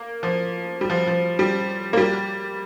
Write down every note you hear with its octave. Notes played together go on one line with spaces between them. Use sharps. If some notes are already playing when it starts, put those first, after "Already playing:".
Already playing: A#3
F3
G3
F3
F3
G3
A#3
G3